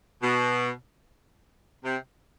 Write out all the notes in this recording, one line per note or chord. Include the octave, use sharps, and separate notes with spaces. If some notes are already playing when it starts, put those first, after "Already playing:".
B2
C3